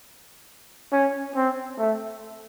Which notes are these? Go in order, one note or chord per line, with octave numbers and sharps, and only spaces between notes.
C#4
C4
A3